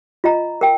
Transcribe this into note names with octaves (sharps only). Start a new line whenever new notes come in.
F4 D#5 A#5
A#4 G5